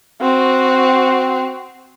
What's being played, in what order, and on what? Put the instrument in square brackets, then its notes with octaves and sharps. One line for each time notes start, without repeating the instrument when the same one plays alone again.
[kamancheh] C4 F#4